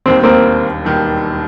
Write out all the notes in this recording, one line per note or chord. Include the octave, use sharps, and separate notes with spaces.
E1 D#2 D#3 G3 C4
A#3 C4
E1 D#2 D#3 G3